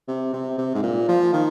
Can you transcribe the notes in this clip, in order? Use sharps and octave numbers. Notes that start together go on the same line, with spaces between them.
C3
C3
C3
G#2
A#2
F3
D#3